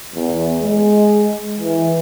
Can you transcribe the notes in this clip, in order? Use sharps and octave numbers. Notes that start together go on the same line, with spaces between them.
E2
G#3
E3